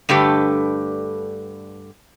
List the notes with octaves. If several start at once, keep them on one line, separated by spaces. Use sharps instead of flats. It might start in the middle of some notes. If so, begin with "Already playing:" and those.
G2 D3 A3 G4 B4